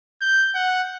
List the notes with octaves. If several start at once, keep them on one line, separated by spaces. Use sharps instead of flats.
G6
F#5